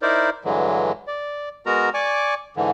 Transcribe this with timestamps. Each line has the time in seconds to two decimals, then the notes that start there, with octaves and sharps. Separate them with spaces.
0.02 D#4 E4 A#4 C5 D5
0.45 G2 D3 E3 F#3 G#3
1.07 D5
1.66 G#3 B3 F#4 A#4 A#5
1.94 D5 G#5 C#6 D6
2.56 G#2 D3 E3